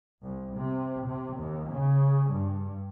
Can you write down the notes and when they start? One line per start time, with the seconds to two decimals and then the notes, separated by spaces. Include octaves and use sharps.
0.23 C2
0.56 C3
1.05 C3
1.38 D#2
1.73 C#3
2.31 G2